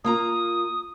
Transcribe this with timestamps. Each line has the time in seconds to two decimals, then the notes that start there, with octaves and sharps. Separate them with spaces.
0.04 A#3 F4 A#5 D#6